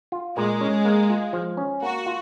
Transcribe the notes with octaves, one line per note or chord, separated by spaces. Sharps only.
F4
A#2 G#3
C#4
A#3
F4
F3
C#4
A#3 F#4
F4